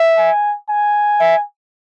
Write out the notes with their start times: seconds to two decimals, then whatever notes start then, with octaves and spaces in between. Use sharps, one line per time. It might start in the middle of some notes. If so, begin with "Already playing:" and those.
Already playing: E5
0.18 G#5
0.69 G#5
1.20 E5